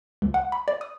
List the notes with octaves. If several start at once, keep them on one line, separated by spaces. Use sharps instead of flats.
C#2
F#5
B5
D5
D#6